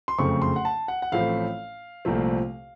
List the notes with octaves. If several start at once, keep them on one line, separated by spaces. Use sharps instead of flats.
C6
F#1 F2 C#3 A3 C4 C#6
C6
F#5
A5
F#5
F#5
A1 A2 F3 A3 C4 F5
C2 A#2 F3 A3 C4